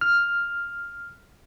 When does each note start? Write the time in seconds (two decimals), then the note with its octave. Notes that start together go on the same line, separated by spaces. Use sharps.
0.01 F6